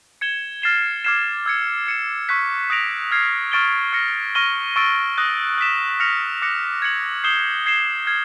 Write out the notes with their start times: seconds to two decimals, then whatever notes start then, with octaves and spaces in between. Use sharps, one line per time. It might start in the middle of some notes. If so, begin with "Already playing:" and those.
0.21 G#6 C#7 E7 G7
0.62 F6 A6 C7 E7 G7
1.04 D6 F6 G#6 C7 E7
1.46 E6 G#6 C#7
1.87 G#6 C#7 E7
2.29 C#6 F#6 B6
2.70 D#6 F#6 A#6 D7 F7
3.11 F6 G#6 C7
3.52 C#6 F6 A6 D7 G7
3.93 F6 A#6 C#7
4.35 C#6 F6 A#6 D#7 G7
4.76 C#6 E6 A6 D7
5.18 D#6 F#6 A#6
5.58 F#6 B6 E7
6.00 F6 A#6 C#7 F7
6.42 D6 F#6 A#6 C#7
6.82 G#6 C#7 F#7
7.24 D#6 G6 C7 E7 G7
7.66 G#6 C7 E7 G7
8.06 F6 G#6 C7